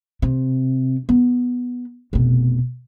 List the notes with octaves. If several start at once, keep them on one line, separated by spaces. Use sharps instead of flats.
C3
B3
F1 B2